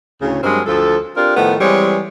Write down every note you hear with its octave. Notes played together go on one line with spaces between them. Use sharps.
D2 A2 C#3
G2 F#3 G#3 C4 A#4
D2 F3 A4
C4 D4 F4 G4 A#4
A2 D#3 F3 A3 B3
E3 G3 G#3 C4 C#5